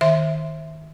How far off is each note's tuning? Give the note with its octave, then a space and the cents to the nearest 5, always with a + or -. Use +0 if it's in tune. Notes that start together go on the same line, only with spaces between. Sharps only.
D#3 +10 E5 +0